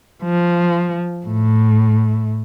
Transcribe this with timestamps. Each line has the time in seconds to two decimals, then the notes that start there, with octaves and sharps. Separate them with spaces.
0.23 F3
1.26 A2